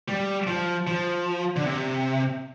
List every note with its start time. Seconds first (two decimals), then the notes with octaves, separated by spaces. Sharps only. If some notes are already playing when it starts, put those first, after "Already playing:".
0.08 G3
0.47 F3
0.87 F3
1.56 D3
1.66 C3